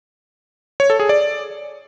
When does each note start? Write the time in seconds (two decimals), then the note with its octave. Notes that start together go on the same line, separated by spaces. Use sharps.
0.80 C#5
0.90 A4
1.00 G#4
1.09 D5